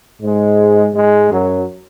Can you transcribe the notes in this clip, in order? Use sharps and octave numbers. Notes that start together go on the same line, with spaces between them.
G#2 G#3
G#2 G#3
F#2 F#3